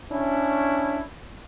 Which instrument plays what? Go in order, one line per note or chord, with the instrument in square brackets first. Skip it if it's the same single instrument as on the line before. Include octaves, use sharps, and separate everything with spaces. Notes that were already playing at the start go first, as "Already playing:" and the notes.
[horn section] C#4 D4 E4